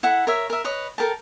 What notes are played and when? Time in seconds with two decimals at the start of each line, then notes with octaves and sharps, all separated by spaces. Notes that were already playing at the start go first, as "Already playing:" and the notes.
0.03 E4 A4 F#5
0.27 A#4 C#5 E5
0.50 A#4 E5
0.64 B4 C#5 D#5
0.98 A4 A#4 G5 A5